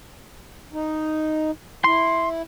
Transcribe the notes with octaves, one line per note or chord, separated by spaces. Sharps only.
D#4
E4 C6